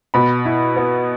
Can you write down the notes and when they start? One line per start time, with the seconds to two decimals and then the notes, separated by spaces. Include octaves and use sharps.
0.14 B2 B5
0.46 E4
0.76 B3